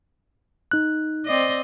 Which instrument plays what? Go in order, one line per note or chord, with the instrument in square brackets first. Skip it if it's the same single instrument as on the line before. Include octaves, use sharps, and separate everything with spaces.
[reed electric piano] D#4 F#6
[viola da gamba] C4 D5 D#5